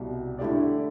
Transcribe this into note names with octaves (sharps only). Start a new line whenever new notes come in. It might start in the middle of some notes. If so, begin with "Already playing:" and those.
Already playing: C2 B2 G3
D3 A3 E4 G4 D5